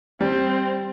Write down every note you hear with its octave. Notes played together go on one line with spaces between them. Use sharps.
G3 C4